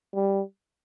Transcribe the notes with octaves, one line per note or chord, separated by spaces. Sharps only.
G3